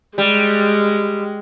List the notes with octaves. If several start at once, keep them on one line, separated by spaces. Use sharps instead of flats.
G3 G#3